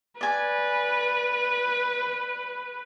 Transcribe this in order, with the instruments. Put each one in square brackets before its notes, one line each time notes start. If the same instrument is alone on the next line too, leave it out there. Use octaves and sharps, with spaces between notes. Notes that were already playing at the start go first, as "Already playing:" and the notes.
[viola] B4 [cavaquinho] D5 G#5